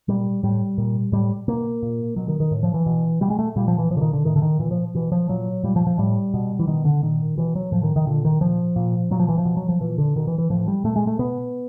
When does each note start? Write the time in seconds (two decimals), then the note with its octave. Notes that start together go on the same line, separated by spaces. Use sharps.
0.08 A#2 G3
0.43 A2 G3
0.78 A#2
1.12 A2 G3
1.48 B2 A#3
1.82 A#2
2.16 B2 F#3
2.28 D#3
2.40 D#3
2.51 A2
2.63 F3
2.74 E3
2.86 B2
3.21 B2 G3
3.30 G#3
3.39 A3
3.56 A#2 G3
3.68 F3
3.78 E3
3.90 A#2 F3
3.97 D3
4.01 D#3
4.13 D3
4.25 A2 D#3
4.36 D3
4.42 D#3
4.59 A#2 E3
4.71 F3
4.95 B2 E3
5.12 F3
5.29 A#2 F#3
5.64 A#2 G3
5.76 F3
5.87 F3
5.98 A2 G3
6.34 B2
6.59 E3
6.67 B2 D#3
6.85 D3
7.03 A#2 D#3
7.37 B2 E3
7.55 F#3
7.72 A2 F3
7.83 D#3
7.96 D#3
8.07 A#2 D3
8.25 D#3
8.41 A#2 F3
8.76 A#2
9.11 A#2 F#3
9.20 F3
9.29 E3
9.38 F3
9.45 B2
9.57 F#3
9.69 F3
9.80 A#2 E3
9.98 D3
10.16 B2 D#3
10.27 E3
10.38 E3
10.50 A2 F3
10.68 G3
10.84 A#2 A3
10.96 G#3
11.07 A3
11.19 B2 B3